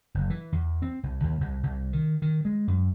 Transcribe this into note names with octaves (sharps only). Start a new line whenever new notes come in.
F#1
E3
E2
C4
C2
D#2
C2
C2
D#3
D#3
G#3
F#2